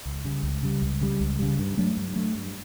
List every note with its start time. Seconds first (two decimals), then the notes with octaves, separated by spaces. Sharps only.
0.05 C#2
0.25 C#3 G3
0.43 C#2
0.63 C#3 G3
0.82 C#2
1.01 C#3 G3
1.20 C#2
1.39 C#3 G3
1.59 G2
1.77 F#3 A3 D4
1.97 G2
2.16 F#3 A3 D4
2.35 G2